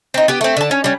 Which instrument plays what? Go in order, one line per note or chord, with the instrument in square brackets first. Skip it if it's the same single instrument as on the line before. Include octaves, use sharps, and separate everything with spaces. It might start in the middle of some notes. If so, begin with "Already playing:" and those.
[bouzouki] C4 D#4
B3 G4
A3 C4
D3 A5
C#4
G3 C#4